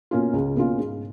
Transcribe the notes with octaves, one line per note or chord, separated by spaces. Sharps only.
B2 A#3 C#4 F4
C#2
B2 A#3 C#4 F4
G#2